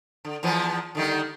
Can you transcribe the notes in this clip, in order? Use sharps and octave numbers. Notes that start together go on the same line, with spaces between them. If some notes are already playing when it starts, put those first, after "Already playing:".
D3
E2 F3 B3
D3 D#3 G3